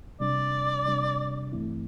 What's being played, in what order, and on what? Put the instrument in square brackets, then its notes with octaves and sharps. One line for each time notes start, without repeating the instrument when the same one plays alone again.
[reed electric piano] C3 G3 D4 [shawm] D5
[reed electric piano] C3 G3 D4
G2 E3 A3 C4 E4